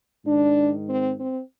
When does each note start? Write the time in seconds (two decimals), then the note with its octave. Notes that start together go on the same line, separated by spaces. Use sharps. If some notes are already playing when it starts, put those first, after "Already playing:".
0.24 G#2 D#3 D4
0.88 C4
1.18 C4